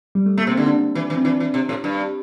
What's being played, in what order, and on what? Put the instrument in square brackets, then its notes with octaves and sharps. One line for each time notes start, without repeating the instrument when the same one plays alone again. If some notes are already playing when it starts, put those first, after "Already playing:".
[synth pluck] G3
A3
[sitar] A3 [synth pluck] A#3
[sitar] C3
[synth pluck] C4
[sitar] D3
[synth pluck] D4
[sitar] E3
E3
[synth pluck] C4
[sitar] E3 [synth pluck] D4
[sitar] E3
C3
A2
G2